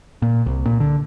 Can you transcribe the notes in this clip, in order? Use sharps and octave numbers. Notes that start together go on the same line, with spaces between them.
A#2
C2
A#2
D3